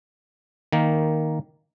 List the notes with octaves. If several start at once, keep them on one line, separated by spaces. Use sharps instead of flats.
D#3 A#3